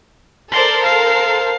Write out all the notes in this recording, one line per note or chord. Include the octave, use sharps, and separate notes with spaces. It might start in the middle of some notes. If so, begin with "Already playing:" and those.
A4 A#4 C5 D5 C6
F5 C7